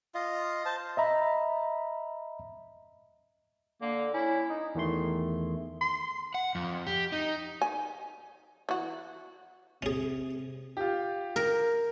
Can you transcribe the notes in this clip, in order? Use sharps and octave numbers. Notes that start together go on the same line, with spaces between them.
F4 D#5 F5
C5 A5
D#5 E5 A#5 B5
D3 A#3
C#4 E4
D#4
E2 D#3 A3 C6
C6
F#5
F2
G4
D#4
G#5
E3 F#4
C3 C#4 G#4
F4 G4
A#4